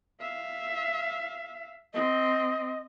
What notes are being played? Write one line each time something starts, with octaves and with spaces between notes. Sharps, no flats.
E5 F5
C4 D#5